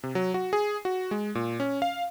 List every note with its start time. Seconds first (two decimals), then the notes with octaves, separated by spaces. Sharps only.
0.03 C3
0.15 F#3
0.34 F#4
0.53 G#4
0.85 F#4
1.11 G#3
1.35 A#2
1.60 C#4
1.82 F5